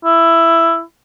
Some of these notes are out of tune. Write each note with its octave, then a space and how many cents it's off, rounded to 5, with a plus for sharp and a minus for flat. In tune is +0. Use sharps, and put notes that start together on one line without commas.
E4 +10